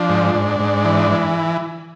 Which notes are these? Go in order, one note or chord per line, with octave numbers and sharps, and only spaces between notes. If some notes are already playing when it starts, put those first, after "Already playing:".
Already playing: F3 D4
G#2
G#2
G#2
E3
E3